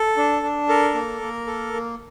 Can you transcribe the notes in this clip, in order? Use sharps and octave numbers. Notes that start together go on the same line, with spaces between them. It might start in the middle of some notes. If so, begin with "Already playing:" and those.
Already playing: A4
D4
D4
A4 A#4
A#3
A#3
A4
A#3